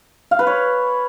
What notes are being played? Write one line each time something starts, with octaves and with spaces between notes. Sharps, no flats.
F5
B4
C#5